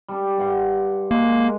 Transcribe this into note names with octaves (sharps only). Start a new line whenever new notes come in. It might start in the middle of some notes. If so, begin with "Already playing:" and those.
G3 D4
G2 F#5 C6
G#3 A#3 A#4